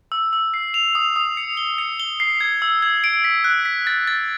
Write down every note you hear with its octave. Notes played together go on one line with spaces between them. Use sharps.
E6
E6
C7
F7
D#6
D#6
C#7
G7
C#7
G7
C7
G#6
E6
G#6
D7
B6
F#6
B6
A6
A6